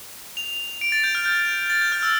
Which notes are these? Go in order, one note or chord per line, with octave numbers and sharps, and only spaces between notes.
F7
D7
A6
G6
F6
G6
A6
G6
F6
E6